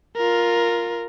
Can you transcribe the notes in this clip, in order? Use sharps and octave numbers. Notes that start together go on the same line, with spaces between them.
F4 A#4